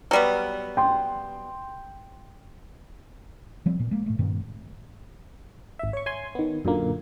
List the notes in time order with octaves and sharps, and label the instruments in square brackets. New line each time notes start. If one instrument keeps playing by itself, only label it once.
[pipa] F#3 G3 B3
[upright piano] G5 C6
[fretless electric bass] F3 G3 C4
A#2 B3
G#3 A#3
A2 A3
G2 A#2 D#3 C4
[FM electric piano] G#1 E5
C#5 C#6
C#5 G#5 C6
D#3 B3
F#2 A#2 D3 A#3